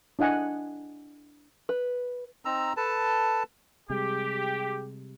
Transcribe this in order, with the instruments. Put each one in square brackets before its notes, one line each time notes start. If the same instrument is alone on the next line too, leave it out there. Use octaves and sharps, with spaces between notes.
[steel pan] D4 E4 D#5 F#5 G#5
[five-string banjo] B4
[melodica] C4 D#4 A#5 E6
A4 B4 A5
[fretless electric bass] C3 G3 G#3 [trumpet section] G4 [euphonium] G#4